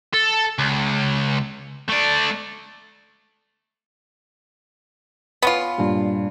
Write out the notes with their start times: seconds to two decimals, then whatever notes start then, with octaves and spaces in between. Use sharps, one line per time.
0.14 A4
0.59 C#2
1.88 A3 D5
5.42 B3 C#4 F4 C#7
5.78 G2 A#2